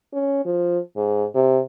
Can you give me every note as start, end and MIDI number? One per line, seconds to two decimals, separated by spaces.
0.13 0.45 61
0.45 0.78 53
0.96 1.25 44
1.35 1.60 48